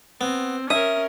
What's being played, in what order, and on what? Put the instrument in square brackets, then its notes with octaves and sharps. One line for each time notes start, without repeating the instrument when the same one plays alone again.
[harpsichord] B3 [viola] C4
[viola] C#4 A#4 [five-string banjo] E5 [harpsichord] D#6